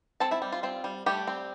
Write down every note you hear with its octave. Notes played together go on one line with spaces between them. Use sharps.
C4 A4 A5
E4 E5
G3
F4
C4 F4
G3
G3 A3 G4
C4